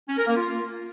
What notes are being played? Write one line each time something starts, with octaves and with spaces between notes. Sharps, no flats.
C#4
A#4
A#3
F4